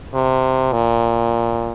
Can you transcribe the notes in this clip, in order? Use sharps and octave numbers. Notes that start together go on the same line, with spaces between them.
C3
A#2